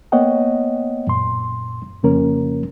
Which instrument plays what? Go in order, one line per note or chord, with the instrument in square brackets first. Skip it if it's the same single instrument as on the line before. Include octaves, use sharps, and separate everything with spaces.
[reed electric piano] A#3 B3 C#5 D#5 F#5 G5
F#2 A#2 C6
F2 C#3 F3 A#3 C#4 A#4